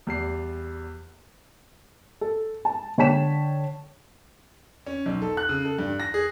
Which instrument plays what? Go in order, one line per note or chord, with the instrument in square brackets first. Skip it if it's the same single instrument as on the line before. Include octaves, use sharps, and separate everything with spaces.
[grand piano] E2 G3 C7
[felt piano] A4
A5
D3 C#5 G5 A5 B6 E7
[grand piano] C#4
B1
A4
F#6
C#3
A4
G2
A#6
G#4